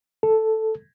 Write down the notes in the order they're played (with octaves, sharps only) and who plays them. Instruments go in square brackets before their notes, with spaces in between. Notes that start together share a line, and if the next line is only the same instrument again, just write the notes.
[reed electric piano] A4